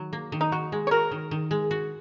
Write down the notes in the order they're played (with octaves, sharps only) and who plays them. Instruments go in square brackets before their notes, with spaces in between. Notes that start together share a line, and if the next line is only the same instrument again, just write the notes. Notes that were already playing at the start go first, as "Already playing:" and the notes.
Already playing: [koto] D#3 F#3
A#3
D#3
[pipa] D#4
[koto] D#3 [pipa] F#4
[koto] G#3
[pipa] C#5
[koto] F#4 [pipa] A#4
[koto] D#3
D#3
G#3
F#4